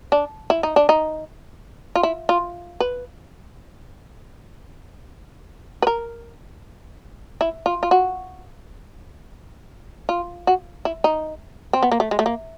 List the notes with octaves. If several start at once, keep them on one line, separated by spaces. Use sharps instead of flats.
D4
E4
D#4
D4
D#4
F4
E4
F4
B4
B4
A#4
E4
F4
F4
F#4
F4
F#4
E4
D#4
C4
B3
A#3
A3
G#3
A3
A#3